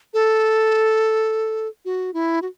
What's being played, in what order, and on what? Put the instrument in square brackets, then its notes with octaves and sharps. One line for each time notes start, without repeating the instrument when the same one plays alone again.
[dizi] A4
F#4
E4
F#4